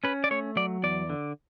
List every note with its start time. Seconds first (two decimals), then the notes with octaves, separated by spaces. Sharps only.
0.04 C#4 B4
0.24 D5
0.31 A3 C#5
0.57 F#3 D5
0.83 E2 D5
1.10 D3